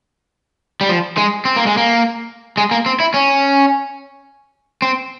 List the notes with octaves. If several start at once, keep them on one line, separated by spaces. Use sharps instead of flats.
G3
F3
G#3
C4
A#3
G#3
A#3
G#3
A#3
C4
E4
C#4
C4